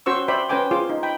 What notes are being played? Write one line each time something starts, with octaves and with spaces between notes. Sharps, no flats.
C#4 F#4 C5 C#6 E6
C5 D5 E5 G5 B5
C#4 B4 C5 G5 G#5 D6
F4 G#4 C5 D6
D#4
G5 B5